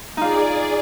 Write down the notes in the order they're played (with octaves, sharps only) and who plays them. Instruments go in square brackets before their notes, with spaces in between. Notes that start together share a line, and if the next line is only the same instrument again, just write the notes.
[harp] D#4 F4 [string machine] G#4 D5